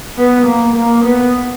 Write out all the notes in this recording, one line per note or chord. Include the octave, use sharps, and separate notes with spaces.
B3
A#3
A#3
B3